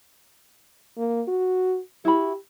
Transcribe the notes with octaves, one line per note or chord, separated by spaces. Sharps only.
A#3
F#4
E4 F#4 G4 B5